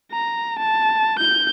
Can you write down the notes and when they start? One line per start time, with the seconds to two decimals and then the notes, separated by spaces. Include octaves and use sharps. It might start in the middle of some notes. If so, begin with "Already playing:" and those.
0.12 A#5
0.59 A5
1.19 G6